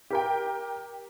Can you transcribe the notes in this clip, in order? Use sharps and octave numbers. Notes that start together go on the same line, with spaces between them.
G4 A#4 G5